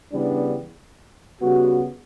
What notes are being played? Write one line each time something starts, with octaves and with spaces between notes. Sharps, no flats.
C#3 E3 G3 B3 D4
C#3 G3 B3 F#4